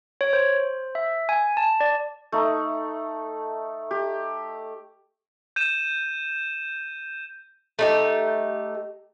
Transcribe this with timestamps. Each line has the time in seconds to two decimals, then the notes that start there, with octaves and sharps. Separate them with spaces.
0.21 C#5
0.33 C5
0.95 E5
1.29 G#5
1.57 A5
1.80 D5
2.32 A3 D#4
3.91 G4
5.56 G6 D#7 E7
7.79 A3 D#4 G4